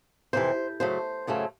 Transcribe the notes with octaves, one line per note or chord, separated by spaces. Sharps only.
F2 C3 E3 C5
F#2 C#3 F#3 A3 C5
F#2 C#3 F#3 A3